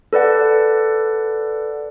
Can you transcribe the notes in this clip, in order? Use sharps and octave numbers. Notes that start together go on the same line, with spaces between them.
A4 B4 D5 F#5